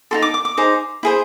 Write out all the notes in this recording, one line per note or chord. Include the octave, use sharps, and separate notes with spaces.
D#4 F#4 A4 C6
D6
D6
D6
D#4 G#4 C5
E4 G#4 C5